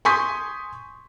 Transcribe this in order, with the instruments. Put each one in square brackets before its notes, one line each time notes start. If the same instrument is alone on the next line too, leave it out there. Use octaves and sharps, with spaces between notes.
[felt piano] G#5 C6 C#6 D#6 G6 B6